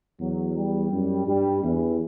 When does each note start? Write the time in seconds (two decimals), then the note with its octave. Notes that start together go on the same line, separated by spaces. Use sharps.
0.20 E2 F#3
0.56 G3
0.92 F#2
1.27 G2 G3
1.63 E2 E3